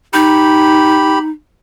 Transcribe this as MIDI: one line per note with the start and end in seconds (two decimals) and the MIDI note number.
0.13 1.30 63
0.13 1.19 67
0.13 1.19 83